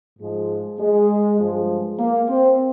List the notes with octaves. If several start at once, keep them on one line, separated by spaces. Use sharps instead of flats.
G#2 F3 G#3
G#3
G2 F3 G#3
A#3
C4